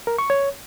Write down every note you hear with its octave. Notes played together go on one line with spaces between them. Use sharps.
A#4
C#6
C#5